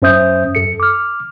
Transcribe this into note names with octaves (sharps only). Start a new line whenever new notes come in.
F#2 C#4 C5 E5 D#6 G6
F#2 A4 C#7
D6 F6